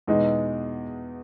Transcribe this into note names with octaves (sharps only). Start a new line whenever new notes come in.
E2 B2 G#3 D#4